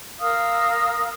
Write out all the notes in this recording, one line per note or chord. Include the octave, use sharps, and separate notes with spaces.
A#4 F5 D#6 E6